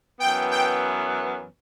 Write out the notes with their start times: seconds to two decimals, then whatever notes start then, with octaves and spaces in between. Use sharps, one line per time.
0.20 F#2 E3 B3 G5
0.51 G5